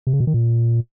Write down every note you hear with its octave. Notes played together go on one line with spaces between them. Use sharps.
C3
C#3
B2
D#3
A#2